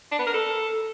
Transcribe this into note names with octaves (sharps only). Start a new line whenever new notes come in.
D4
B3
A#4
A4